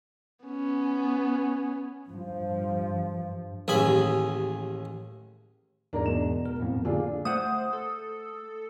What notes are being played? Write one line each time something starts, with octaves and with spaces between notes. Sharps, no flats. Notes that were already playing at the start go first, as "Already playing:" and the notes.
B3 C#4
G2 F3
A1 D#2 G#4 B5
E2 G#2 G#3 D4 A#4 A#5
B2 E7
A#4
F2 A2
D3 A#3 D4 F4 G#4
A3 C5 F#5 D#6
A4